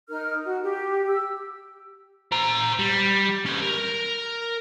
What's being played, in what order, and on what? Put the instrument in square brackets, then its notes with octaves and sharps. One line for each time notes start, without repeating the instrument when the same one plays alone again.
[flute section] D#4 A#4 F6
F#4
G4
E6
[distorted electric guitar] C5 A#5
G3
C#4 G4
A#4